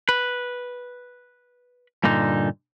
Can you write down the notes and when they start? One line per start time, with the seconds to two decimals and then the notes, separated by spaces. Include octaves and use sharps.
0.09 B4
2.04 G2 A#2 D3 D#4